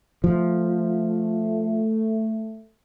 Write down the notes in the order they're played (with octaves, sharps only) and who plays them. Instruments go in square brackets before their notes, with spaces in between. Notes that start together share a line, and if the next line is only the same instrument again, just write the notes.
[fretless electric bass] F3 [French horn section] A3